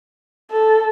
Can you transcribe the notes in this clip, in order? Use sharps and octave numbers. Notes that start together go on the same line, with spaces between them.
A4